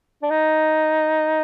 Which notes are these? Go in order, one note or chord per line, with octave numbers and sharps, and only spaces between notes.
D4
D#4